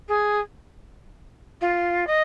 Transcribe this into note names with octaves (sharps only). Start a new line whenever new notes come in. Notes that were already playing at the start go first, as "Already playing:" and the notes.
G#4
F4
D#5